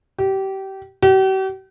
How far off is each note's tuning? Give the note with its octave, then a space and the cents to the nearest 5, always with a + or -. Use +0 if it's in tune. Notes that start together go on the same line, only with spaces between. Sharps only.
G4 -25
G4 -45